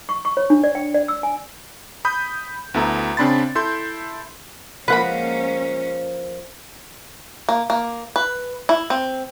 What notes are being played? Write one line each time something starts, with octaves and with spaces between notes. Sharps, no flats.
C#6
C#6
C#5
D4
D5
G5
D5
E6
G#5
B5 D#6 G6
D2 B3 E4 A4 A#5
C#3 C4 D4 B5 C6 A6
E4 A4 C6 G6 C7
F3 G#3 A#3 C#4 B4 F#5 B5
A#3
A#3
B4
E4
C4